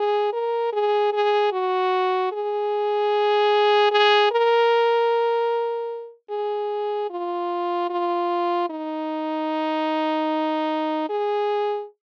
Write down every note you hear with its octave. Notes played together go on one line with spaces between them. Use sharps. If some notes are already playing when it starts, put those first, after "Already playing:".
Already playing: G#4
A#4
G#4
G#4
F#4
G#4
G#4
A#4
G#4
F4
F4
D#4
G#4